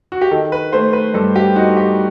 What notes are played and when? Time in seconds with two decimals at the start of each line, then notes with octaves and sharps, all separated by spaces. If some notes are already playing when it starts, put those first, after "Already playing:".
0.12 F#4
0.21 G4
0.31 D#3 A4
0.52 B4
0.73 A3 C5
0.93 B4
1.14 G2 A4
1.36 G4
1.56 D#4 F#4
1.77 G4